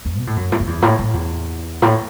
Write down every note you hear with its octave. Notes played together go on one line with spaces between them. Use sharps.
E2
B2
A2
F#2
A2
F#2
E2
A2
A2
E2
A2